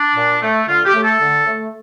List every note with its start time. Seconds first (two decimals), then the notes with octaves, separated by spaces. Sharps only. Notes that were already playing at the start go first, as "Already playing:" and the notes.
Already playing: D4
0.15 A#2
0.41 A3
0.68 D3 F4
0.85 G4
0.94 A3
1.03 A4
1.20 D3
1.47 A3